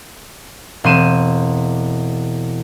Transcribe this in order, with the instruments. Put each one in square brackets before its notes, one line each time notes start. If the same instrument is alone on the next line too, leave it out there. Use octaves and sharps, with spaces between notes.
[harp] E1 C4 C6 D#7 E7